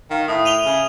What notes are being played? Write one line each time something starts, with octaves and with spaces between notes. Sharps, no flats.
D#3 F5
A2 E5 D#6
D#7 F7 G7
C#3